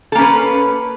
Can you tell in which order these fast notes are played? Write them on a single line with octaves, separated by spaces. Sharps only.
A4 A#3 C#4 B4